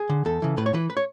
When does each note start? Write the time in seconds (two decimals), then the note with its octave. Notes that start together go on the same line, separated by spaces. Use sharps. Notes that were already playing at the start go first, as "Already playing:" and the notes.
Already playing: G#4
0.09 D3
0.25 E2 A4
0.42 C#3 E3
0.57 A2 B4
0.66 C#5
0.74 E3 B4
0.90 B4
0.97 C#5